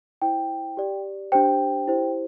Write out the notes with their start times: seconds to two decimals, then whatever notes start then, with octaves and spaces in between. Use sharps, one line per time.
0.22 E4 C5 G5
0.77 G4 D5
1.32 D4 G4 C5 G5
1.87 E4 G4 C5